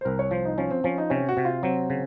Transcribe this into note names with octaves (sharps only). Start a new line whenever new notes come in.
C5
C2 A#4
C#5
F3 C5
D#4
F3 C#4
C4
F3 C#4
D#4
C3 C#4
F#4
C3
F4
F#3 C4
C#3